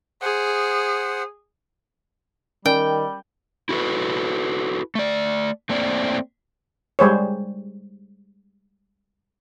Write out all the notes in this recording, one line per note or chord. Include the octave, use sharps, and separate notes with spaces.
G#4 C5 F#5
D#3 G3 C#4 A#4 D5 G5
E4 F#4 A4 B4
A3 D5
A3 A#3 C4 D5
G3 G#3 C5 C#5